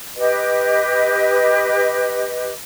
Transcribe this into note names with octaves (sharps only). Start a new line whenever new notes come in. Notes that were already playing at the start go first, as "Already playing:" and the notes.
G4 B4 D#5